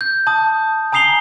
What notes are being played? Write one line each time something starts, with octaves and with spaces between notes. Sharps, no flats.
G6
A5 D#6
G#5 A#5 D#6 C7 F7 G7